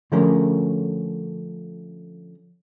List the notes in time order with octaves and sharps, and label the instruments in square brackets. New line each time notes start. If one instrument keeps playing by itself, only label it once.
[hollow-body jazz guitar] D3 F3 A3 C#4 G#4 A#4